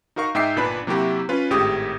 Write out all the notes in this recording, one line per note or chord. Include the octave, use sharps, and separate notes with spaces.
D#4 F#4 A#4 F5 C#6
G#2 D#4 E5 G5 D6 C7
G1 A#2 D4 B4 B5
C3 F#3 A#3 E4 F#4 G4
C#4 F4 B4
G#1 A2 G4 G#4 D#6